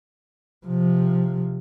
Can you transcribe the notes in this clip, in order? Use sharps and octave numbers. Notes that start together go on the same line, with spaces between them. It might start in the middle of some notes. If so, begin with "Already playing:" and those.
C3 F3